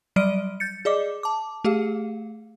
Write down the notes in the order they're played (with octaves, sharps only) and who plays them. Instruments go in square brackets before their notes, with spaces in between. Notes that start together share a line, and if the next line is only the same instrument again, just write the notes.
[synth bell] F#3 G3 D5 F6 D7 D#7
G6 A6 C#7
G#4 D5 D#5 D6
A5 D6
A3 G4 G#4 F5